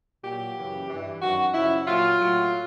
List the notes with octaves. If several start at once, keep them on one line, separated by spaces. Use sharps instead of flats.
A#2 F#3 G4
F#2 C#3 E3
G2 E3
F#2 D#3 F#3 F#4
F#2 C#3 F3 E4
A#2 F#3 F4
A2 F#3